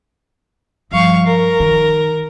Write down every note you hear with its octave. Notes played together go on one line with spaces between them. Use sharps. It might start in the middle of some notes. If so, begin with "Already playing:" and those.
G2 F3 F5 C#6
A#4
D#3